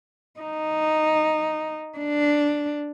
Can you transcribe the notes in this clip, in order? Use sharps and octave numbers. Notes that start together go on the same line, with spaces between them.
D#4
D4